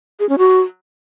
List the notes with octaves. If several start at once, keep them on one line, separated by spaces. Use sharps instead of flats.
G#4
C#4
F#4